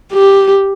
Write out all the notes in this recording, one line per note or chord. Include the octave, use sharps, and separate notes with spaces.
G4